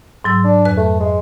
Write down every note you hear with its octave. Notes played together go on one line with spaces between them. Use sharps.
G#2 F#3 E6
D4
F2 B4 F#6
A3
G#3